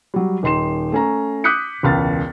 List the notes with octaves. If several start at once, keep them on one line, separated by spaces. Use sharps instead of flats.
F#3 G3
D#1 D#4 C6 C7 E7
A3 C#4 A#5
D6 D#6 F#6 G6 B6 C#7
E1 C#2 F6 A6